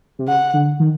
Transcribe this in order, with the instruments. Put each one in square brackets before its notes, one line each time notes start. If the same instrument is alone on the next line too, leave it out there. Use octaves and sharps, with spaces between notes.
[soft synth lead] C3
[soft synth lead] C#3 [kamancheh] F#5
[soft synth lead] D3
D#3